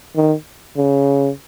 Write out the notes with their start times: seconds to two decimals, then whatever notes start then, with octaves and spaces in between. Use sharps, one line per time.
0.16 D#3
0.77 C#3